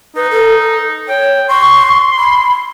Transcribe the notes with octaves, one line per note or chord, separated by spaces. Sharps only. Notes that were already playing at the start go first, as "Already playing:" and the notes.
D#4 B4
A4
C#5 G5
C6 C#6
B5